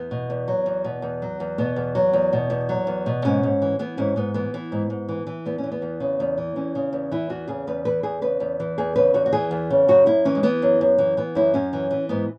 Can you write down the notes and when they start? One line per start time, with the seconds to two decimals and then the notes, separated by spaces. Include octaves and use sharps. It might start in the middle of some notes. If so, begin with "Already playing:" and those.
Already playing: E2 B3
0.11 B2
0.30 E2
0.48 F#3
0.66 E2
0.84 B2
1.02 E2
1.22 F#3
1.40 E2
1.58 B2 B3
1.76 E2
1.95 F#3
2.13 E2
2.33 B2
2.50 E2
2.69 F#3
2.87 E2
3.06 B2
3.25 G#2 C#4
3.43 G#2
3.62 E3
3.79 E3 B3
3.97 G#2 C#4
4.16 G#2 B3
4.34 E3 B3
4.54 E3
4.72 G#2
4.90 G#2
5.09 E3
5.27 E3
5.46 E2 B3
5.58 C#4
5.64 E3
5.72 B3
5.82 E2
6.00 C#3
6.20 E2
6.38 E3
6.56 E2 C#4
6.75 C#3
6.93 E2
7.11 E3 E4
7.29 E2 F#4
7.48 C#3 G#4
7.67 E2 B4
7.85 E3 B4
8.03 E2 G#4
8.22 C#3 B4
8.40 E2
8.60 E3
8.78 E2 G#4
8.96 C#3 B4
9.14 E2 F#4
9.26 F#4
9.33 E3 G#4
9.51 E2
9.70 C#3
9.88 F#2 F#4
10.06 F#2 E4
10.25 E3 C#4
10.35 G#3
10.43 E3 B3
10.62 F#2
10.81 F#2
10.98 E3
11.17 E3 B3
11.35 F#2 E4
11.54 F#2 C#4
11.73 E3
11.91 E3
12.09 G#2 B3